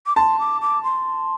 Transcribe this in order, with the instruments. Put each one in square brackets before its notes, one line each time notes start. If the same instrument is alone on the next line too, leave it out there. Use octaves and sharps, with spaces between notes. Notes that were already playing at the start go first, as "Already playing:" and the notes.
[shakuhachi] D6
[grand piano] A5 [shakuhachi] C6
[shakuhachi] D6
D6
C6